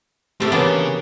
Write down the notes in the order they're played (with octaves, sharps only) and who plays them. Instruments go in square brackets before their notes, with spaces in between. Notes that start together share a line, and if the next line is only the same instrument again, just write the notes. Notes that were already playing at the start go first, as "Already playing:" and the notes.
[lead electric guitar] A2 [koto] C3 A3 G4
[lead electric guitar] C#3 G#4 [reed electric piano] E3 C#5 [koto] A#3 B3 D4